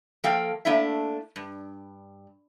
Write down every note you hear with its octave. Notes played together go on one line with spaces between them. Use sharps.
F3 A#3 A4 F5 G5
A3 A#3 D4 E4 E5
G2